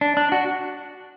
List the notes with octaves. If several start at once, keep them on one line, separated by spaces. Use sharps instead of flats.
D4
D4
F#4